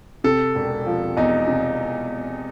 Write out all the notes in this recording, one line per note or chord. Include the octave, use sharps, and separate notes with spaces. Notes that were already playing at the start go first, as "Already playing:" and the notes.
C3 A4
E1
F3
E2 D#4
C3